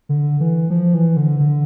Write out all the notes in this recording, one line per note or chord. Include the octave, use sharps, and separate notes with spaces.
D3
E3
F3
E3
D3
D3